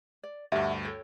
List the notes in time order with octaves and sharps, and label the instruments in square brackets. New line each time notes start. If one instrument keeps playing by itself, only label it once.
[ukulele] D5
[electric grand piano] D2 G2 [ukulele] G4 E5 F#5
[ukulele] A4 C#5 G5